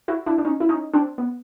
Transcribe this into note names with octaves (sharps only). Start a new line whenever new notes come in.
E4 F#4
D4 E4
D4
C#4 D#4
E4
C#4 D#4
C4 D4
B3